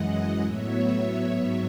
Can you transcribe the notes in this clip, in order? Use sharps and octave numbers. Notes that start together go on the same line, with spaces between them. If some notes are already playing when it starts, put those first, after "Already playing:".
Already playing: F#2 E3 G#3 D#5 F#5
A2 F#3 B3 C#5 E5
G#2 F#3 B3 C#5 E5